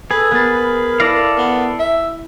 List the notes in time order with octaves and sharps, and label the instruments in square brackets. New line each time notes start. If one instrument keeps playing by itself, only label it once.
[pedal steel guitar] G#4 [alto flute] A4 [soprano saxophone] B4
[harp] B3 A6 [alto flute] A#4 [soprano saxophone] B4
[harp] E4 A#6 [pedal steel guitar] A4 D5 F5
[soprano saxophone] B3
E5